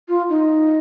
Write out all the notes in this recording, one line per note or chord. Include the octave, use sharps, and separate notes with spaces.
F4
D#4